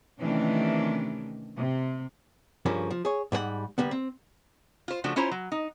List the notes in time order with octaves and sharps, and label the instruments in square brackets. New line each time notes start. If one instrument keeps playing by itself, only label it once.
[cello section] C3 D#3 E3 A3 C#4 D4
C3
[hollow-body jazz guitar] G2 C#3 F3 A#3 C#4
F3
G#4 C#5
G#2 G3 A#4 F#5
D3 G3 A#3 B3
C4
[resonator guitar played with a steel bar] F4 C5
C#3 F3 A3 D4 F#4
C#4 E4 F4 C5 C#5 A#5
F#3
D#4